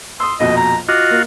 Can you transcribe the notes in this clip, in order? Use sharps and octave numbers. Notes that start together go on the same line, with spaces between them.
C6 D#6 E6
A#1 F2 B2 D#5
A#5
F4 F#4 D#5 D6
A#3